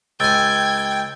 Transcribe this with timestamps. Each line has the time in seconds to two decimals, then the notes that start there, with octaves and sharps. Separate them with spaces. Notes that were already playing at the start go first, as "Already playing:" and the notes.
0.20 C#2 G5 G#5 E6 G#6 A6